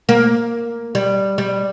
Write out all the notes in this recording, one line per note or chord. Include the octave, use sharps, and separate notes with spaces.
A#3
G3
G3